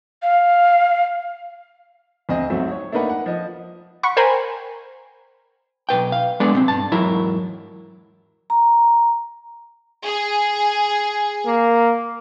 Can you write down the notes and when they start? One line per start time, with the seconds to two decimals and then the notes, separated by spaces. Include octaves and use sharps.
0.22 F5
2.29 D2 C4 D#5
2.50 G#2 F#3 A3 C4 E5
2.71 C#5
2.92 A3 A#3 D4 D#4 B4 F#5
3.10 F#5
3.26 F3 D#5
4.03 F#5 B5 C#6
4.17 A#4 C5 G5 G#5 A#5 B5
5.89 B1 B4 G5
6.12 F5
6.40 G#3 B3 D4 A4 B4 D5
6.53 B1 B3 C4
6.68 G2 A5
6.91 E2 G#2 F#3 E4 A#4
8.50 A#5
10.05 G#4
11.46 A#3